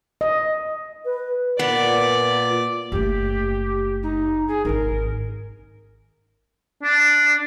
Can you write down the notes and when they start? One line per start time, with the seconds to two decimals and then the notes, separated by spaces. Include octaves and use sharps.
0.21 D#5
1.05 B4
1.59 A#2 B3 D5
2.92 F#1 A3 G4
4.03 D#4
4.48 G#4
4.65 G#1 D#4 A#4
6.83 D4